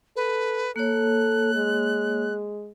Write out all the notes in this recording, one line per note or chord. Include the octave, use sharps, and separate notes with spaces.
A4 B4
A#3 A4 C#5 F#6
G#3